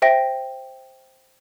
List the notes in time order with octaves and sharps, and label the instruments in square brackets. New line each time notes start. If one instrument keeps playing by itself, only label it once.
[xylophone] C5 E5 G5 A#6